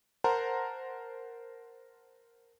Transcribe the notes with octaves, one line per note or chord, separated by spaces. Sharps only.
A#4 C5 F#5 A5 A#5 C6